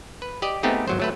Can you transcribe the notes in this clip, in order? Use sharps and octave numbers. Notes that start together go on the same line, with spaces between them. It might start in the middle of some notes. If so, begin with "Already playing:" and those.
B4
G4 D5 D#5
A3 B3 C4 D#4 G4 G#4
G#1 F#3 C5
F#3 A3 B4